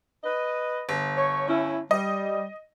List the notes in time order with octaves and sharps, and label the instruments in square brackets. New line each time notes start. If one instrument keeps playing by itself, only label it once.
[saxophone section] B4 D#5
[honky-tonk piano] G1
[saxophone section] C#5
C#4 E4
[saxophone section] G3 [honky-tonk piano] D#5